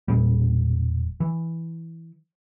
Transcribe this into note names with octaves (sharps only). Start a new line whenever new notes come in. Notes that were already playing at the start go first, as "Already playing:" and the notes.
E1 A#2 G3
E3